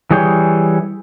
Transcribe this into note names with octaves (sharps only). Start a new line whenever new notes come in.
E3 G3 G#4 C#5 G5